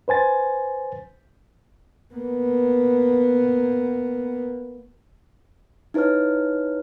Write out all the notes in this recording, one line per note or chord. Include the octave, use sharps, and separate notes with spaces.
B4 C5 G#5 A6
A#3 B3
D#4 E4 B4 C#5 F6